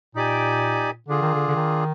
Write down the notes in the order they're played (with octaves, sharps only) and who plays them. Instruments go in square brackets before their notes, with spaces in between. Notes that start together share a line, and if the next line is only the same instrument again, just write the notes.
[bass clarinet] A#2 [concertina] D#4 G4 D5 G#5
[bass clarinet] D3 [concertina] D4 F4 G#4
[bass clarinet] D#3
D3
D3
D#3